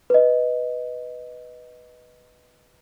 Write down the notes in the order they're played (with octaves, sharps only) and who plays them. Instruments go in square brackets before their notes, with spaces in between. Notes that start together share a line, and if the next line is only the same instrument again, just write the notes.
[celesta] B4 D#5